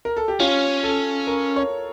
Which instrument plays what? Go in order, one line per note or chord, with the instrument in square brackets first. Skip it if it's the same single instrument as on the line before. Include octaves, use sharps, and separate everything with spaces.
[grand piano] A#4
A4
G4
[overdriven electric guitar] C#4 [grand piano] F4
[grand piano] A4
A#4
C#5